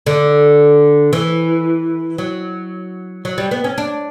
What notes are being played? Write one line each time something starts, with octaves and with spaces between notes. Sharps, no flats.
D3
E3
F#3
F#3
G3
B3
C#4
D4